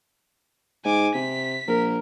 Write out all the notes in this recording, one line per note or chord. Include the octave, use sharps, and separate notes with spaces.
G#2 G#5 D6
C3 B6
A#1 A#4